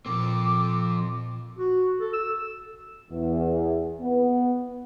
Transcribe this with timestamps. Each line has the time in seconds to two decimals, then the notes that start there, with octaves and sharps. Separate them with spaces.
0.06 A#2 F3 C4 D6
1.59 F#4
2.00 A4
2.13 E6
3.10 E2
4.00 B3